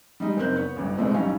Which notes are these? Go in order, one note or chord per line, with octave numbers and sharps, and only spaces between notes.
G3 G#3 D#4
F#1 C4 D#4 A#4 F#6 G6
B3 B4 C#5
A1 D2 G2
E2 B2 E3 G#3 A3 C4
B1 A2 G3 C#4 D#4 F5